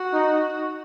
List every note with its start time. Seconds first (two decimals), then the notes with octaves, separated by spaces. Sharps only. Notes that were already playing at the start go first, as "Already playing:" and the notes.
Already playing: F#4
0.13 D#4